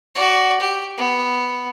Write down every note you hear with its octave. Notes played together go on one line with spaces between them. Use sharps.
F#4 D5
G4
B3